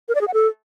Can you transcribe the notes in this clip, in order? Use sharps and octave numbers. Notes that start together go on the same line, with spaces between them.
A#4
D5
G#4
F#5
A4